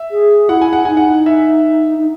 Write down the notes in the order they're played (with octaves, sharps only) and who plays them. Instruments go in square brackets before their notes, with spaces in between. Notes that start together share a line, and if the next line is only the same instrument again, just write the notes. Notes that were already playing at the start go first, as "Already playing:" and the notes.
Already playing: [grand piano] E5
[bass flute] G#4
[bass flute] E4 [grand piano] F#5
[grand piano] G#5
F#5
[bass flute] D#4 [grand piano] G#5
[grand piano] F#5
E5
[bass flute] D#4